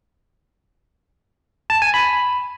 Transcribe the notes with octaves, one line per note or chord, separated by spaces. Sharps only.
A5
G#5
B5